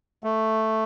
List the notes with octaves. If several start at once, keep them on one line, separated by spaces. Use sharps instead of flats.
A3